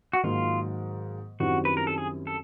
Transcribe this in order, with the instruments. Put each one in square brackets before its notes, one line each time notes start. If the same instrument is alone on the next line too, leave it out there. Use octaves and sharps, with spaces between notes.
[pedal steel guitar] F#4
[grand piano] G#2 D#3 F#3 A#3 [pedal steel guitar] F4
[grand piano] F#2 D#3 G3 C4 E4 [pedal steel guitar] F#4
[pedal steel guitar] B4
A#4
A4
G#4
A4